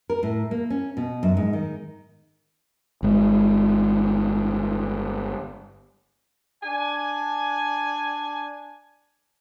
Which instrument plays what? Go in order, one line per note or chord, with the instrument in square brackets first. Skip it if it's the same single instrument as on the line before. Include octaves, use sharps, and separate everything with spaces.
[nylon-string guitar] A#4
A2
A#3
C#4
B2
F#2
G#2
D#3
[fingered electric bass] G1 G#3
[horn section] D4 G#5